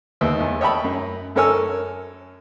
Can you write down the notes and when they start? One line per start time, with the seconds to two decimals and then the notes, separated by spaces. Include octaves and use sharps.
0.21 D#2 B3 D#4 E5
0.40 E2
0.61 C#5 D#5 E5 G5 A5 B5
0.84 F#2
1.35 F#2 A4 A#4 C#5 G#5 E6